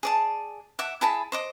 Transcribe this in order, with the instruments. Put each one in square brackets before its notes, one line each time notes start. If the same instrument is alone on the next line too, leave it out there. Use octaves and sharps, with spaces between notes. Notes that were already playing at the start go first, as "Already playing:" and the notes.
[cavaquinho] G#4 D5 A5
E5 F#5 D6
E4 G#4 A5 B5
C5 D#5 D6